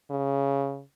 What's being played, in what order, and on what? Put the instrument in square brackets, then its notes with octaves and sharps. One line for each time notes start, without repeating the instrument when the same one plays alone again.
[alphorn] C#3